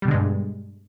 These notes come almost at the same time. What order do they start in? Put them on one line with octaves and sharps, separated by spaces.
G3 B2 D3 G#3 G2